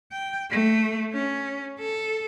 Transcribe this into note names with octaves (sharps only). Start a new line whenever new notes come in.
G5
A3
C#4
A4